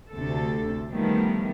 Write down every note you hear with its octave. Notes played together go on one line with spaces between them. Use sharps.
D2 C3 A4
D#3 F3 G3 A3 B3